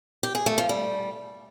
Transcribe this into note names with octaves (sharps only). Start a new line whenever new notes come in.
G4
G#4
A3
F3
G3